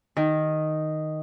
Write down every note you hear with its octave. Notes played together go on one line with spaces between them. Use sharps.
D#3